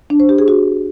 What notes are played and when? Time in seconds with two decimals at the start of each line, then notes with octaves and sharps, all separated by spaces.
0.10 D4
0.20 C5
0.29 G4
0.38 G#4
0.48 F#4